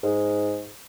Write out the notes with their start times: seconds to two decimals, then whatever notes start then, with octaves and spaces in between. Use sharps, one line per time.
0.03 G#2